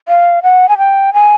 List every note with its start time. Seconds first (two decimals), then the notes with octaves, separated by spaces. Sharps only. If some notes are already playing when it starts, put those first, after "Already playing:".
0.08 F5
0.43 F#5
0.69 G#5
0.78 G5
1.14 G#5